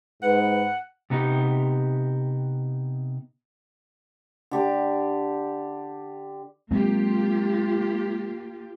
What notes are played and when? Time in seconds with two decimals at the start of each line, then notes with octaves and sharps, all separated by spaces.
0.22 G#2 B4 F#5
1.10 C3 B3 D#4 G4
4.51 D3 G4 D5 D6
6.71 F#3 G#3 A#3 C4 F4 G4